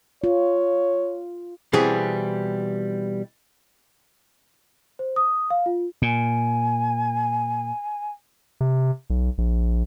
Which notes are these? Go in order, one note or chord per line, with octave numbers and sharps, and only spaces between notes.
F4 C#5
B2 E3 G3 C4 G#4
C5
D#6
F5
F4
A#2 G#5
C3
B1
A#1